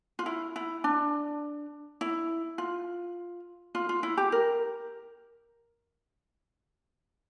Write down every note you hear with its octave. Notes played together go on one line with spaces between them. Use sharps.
F4
E4
E4
D4
E4
F4
F4
F4
E4
G4
A#4